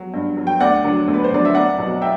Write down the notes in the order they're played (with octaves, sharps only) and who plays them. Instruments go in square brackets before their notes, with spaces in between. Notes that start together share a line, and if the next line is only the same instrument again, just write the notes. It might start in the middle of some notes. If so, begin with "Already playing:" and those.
Already playing: [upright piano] F#3
G2
F#3
G5
D2 D5 F#5
D3 F#3
D2
B4
C5
D3 F#3 D5
E5
C2 D5 F#5
B2 F#3
E5 G5